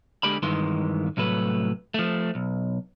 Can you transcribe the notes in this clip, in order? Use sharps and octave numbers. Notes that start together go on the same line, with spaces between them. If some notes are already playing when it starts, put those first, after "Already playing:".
D3 G#3 G4 D5 B5
G2 D#3 E3 G#3 C6
C2 A2 F#3 A3 B4
F3 A3
B1